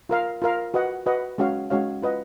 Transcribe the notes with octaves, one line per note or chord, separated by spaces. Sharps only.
F4 A#4 F5
F4 A#4 F5
F#4 B4 D#5 F#5
F#4 B4 D#5 F#5
G#3 C#4 F#4 C#5 F5
G#3 C#4 F#4 C#5 F5
F4 B4 D#5 F#5